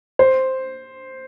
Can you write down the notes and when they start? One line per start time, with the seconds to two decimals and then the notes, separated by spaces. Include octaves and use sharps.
0.19 C5